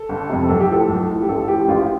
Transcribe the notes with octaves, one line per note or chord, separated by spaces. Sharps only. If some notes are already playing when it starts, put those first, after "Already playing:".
Already playing: A4
G1
F2 C3
B1 A4
G4
A2 F3 A4
B1
A2 F3
G4
A1 A4
A2 F3 G4
A1 F4
G4